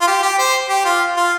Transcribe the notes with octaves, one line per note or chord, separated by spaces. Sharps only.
F4
G4
G4
C5
G4
F4
F4